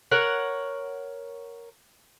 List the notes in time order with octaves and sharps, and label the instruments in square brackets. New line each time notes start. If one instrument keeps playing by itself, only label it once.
[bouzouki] A#4 C#5 F#5